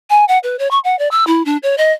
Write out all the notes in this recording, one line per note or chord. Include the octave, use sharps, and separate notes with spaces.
G#5
F#5
B4
C#5
C#6
F#5
D5
E6
E4
D4
C#5
D#5